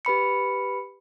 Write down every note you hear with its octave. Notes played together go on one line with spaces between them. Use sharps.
G4 B4 B5 C#7